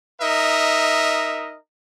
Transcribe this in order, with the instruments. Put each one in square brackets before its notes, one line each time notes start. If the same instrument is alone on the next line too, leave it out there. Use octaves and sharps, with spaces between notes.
[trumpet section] D#4 A#4 D#5 E5